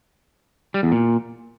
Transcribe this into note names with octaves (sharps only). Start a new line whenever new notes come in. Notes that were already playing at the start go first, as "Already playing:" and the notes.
G3
E2
A#2